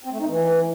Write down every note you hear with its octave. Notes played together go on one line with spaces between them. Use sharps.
C4
A3
D#4
E3